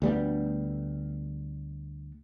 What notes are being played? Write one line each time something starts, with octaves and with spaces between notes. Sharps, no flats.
D2 G3 B3